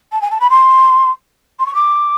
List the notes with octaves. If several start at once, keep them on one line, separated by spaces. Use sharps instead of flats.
A5
G#5
A5
B5
C6
C6
C#6
D6